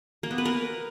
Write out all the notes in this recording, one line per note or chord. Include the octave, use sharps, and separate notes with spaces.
A#3
B3
B4
A#4